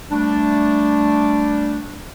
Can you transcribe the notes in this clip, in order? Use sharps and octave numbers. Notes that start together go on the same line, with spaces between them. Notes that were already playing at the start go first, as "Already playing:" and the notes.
G3 A3 D4